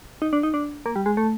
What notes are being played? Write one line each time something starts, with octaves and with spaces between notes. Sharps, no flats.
D#4
D4
D#4
D4
A#3
G3
G#3
A3